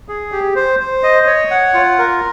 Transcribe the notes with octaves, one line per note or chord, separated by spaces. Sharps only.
G#4
G4
C5
C5
D#5
C#5
F#5
F4
A#4